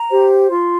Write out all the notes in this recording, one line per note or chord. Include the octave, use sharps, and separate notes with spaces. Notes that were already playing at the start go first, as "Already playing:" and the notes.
Already playing: A#5
G4 C5
F4 C6